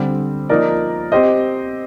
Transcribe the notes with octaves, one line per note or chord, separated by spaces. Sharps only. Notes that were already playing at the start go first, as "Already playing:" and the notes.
Already playing: D3 G3 C4
F3 A#3 D#4 A#4 D5
C4 G4 C5 D#5